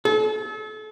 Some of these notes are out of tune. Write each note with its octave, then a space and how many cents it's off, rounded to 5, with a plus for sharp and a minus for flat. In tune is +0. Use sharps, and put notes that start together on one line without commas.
A4 -35